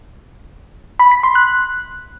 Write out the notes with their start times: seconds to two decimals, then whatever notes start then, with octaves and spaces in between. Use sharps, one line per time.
0.99 B5
1.11 B6
1.23 C6
1.35 F#6